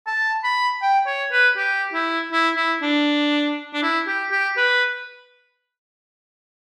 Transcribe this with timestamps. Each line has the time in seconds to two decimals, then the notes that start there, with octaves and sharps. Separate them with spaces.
0.07 A5
0.44 B5
0.82 G5
1.07 C#5
1.32 B4
1.57 G4
1.94 E4
2.32 E4
2.57 E4
2.82 D4
3.74 D4
3.82 E4
4.07 G4
4.31 G4
4.57 B4